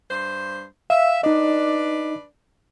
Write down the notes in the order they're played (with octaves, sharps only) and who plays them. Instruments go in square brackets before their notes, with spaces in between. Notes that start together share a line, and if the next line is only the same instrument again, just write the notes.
[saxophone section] G2 C5
[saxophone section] E5 [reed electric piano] F5
[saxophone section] D4 B4 D5 [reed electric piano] D#4 D#5